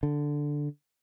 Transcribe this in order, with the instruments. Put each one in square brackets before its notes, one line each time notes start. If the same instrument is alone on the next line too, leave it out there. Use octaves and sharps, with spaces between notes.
[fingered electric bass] D3